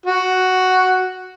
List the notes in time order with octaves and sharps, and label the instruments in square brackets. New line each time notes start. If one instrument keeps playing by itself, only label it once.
[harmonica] F#4